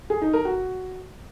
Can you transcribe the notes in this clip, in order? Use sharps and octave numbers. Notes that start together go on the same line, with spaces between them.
G#4
D#4
A#4
F#4